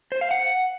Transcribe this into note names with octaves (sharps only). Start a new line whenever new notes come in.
C5
F5
F#5